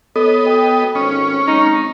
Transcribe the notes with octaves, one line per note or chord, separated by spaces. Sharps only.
B3 A4 C#5 D#5
F#4 G5
G#1 C#4
F#3 G#3 C4 D#4 C#6